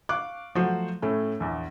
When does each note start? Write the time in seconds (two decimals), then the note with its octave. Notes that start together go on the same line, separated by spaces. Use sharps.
0.09 F5 C#6 D6 F#6
0.55 F3 F#3 A3 F#4 C5
1.02 A2 A3 C#4
1.40 A#1 E2